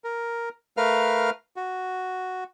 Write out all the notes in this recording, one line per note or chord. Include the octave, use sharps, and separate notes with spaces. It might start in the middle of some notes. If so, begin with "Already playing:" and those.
A#4
A3 A#4 B4 F5 F6
F#4